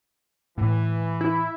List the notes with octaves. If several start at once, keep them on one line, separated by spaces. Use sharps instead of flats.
A2 E3
E4